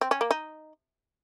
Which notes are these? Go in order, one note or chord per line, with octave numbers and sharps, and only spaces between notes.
C4
C#4
A#3
D#4